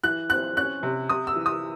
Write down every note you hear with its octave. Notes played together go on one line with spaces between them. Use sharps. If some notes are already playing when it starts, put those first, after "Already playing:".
E3 F#6
C4 F#6
C#4 F#6
C3
C3 D#6
E6
E3
D#6